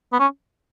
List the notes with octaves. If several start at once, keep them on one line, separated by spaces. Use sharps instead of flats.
B3
C#4